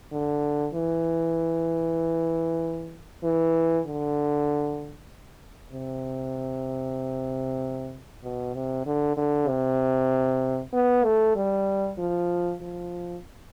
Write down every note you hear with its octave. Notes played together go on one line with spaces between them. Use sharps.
D3
E3
E3
D3
C3
B2
C3
D3
D3
C3
B3
A3
G3
F3
F3